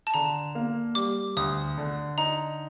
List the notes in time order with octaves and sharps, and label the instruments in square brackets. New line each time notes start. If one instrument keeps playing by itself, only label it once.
[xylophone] A5
[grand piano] D3 [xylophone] A#5
[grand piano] A#3
[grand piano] G3 [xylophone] D6
[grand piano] D2 [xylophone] D#6
[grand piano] D3
[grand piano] D#4 [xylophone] A#5